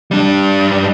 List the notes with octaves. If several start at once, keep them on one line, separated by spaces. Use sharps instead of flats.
G3 D4